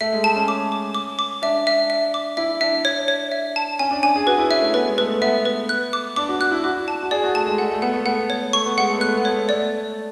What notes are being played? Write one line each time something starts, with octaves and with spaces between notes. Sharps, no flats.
A3 E5
G#3
A3 A5
C#4
D6
D6
D6
D6
D4 E5
E5
E5
D6
E4 E5
D4 E5
C#5
C#5
E5
A5
C#4 G#5
D4
D4 G#5
G#4
F#4 B4
E4
C#4 E5
A3
B3 B4
G#3
A3 B4
A3
B3 E5
B4
F#6
D6
D4 D6
F#4
F#4 F#6
E4
F#4 D6
A5
F#4
G#4 D5
F#4
A3 A5
G#3
A3 F#5
A3
B3 F#5
A3
B3 F#5
C#5
A3 C#6
B3
G#3 F#5
A3
B3 F#6
A3
B3
A3 C#5
A3 D5